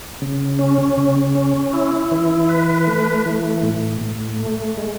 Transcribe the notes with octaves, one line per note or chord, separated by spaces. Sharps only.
C#3
C#4
C#3
C#4
E4
E3
B4
A3
E3
A2
A2
A3
G#3